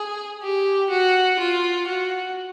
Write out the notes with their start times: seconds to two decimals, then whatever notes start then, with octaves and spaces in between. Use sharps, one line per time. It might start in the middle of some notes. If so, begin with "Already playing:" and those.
Already playing: G#4
0.42 G4
0.90 F#4
1.39 F4
1.87 F#4